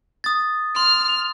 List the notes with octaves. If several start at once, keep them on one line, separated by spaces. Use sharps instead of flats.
D#6 A6
C6 F6